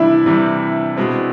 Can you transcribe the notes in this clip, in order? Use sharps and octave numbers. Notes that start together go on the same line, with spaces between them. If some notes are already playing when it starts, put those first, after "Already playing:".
Already playing: C3 E3 G3 D4 E4
C3 E3 G3
B2 G#3 C4